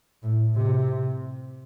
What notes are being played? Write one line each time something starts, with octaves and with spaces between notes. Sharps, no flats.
A2
C3